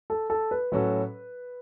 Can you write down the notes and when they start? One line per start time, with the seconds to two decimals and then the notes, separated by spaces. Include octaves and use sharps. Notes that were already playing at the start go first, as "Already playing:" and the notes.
0.10 A4
0.30 A4
0.51 B4
0.72 A2 F#3 C#4 F#4 A4